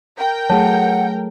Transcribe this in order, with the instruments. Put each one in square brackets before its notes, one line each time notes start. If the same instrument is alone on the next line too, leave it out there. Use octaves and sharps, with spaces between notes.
[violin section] A#4 G5
[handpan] F#3 A3 G#4 [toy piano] C#5 A5 [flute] F#5